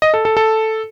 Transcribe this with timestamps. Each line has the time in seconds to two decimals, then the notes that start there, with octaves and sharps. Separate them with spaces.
0.02 D#5
0.14 A4
0.25 A4
0.37 A4